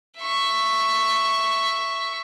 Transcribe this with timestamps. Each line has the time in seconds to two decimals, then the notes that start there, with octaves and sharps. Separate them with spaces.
0.19 E5 C#6